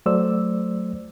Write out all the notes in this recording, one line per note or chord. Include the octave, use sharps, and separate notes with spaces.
F#3 A3 C5 D5 E6